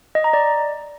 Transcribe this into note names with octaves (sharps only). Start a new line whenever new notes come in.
D#5
A#5
D5